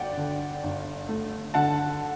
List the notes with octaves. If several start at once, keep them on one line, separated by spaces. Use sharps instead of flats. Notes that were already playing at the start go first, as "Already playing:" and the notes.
Already playing: G1 D5 F#5 G5
D3
G1
A3
D3 F#5 A5